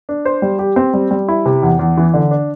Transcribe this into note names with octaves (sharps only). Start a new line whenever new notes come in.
D4
C5
G3
G4
C4
G3
G3
E4
C3
E2
E2
E3
D3
D4